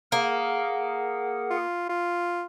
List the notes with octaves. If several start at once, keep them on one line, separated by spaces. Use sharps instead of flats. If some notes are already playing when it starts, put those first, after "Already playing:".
A#3 G#4 A#4 F#5
F4
F4